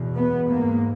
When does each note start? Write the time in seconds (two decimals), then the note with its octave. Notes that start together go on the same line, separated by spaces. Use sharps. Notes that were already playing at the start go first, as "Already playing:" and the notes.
Already playing: E2 B2
0.16 B3
0.49 G#2 A#3